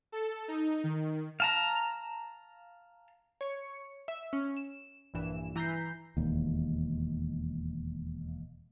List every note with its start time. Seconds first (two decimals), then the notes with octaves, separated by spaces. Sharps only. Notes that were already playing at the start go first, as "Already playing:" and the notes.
0.12 A4
0.48 D#4
0.84 D#3
1.40 F5 A5 A#5
3.41 C#5 C#7
4.08 E5
4.33 C#4
4.57 E7
5.14 A#1 G2 E3 E7
5.56 E3 A#5 G6 B6 C7
6.17 E1 D#2